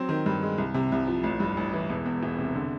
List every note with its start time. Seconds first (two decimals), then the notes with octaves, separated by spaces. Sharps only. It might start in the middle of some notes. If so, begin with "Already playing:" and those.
Already playing: F#3 C4
0.09 D#3
0.26 G2
0.43 G#3
0.58 C2
0.74 C3
0.92 C2
1.07 F3
1.24 A1
1.40 G2
1.57 A1
1.74 E3
1.90 E1
2.06 E2
2.23 E1
2.39 C3
2.55 D3